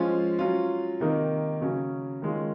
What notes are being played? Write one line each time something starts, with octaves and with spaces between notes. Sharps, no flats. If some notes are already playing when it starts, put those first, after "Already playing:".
Already playing: F3 G#3 C#4 F4
F#3 C#4 F4
C3 D#3 A#3 D#4
C#3 F#3 C#4
D#3 G#3 C#4 F4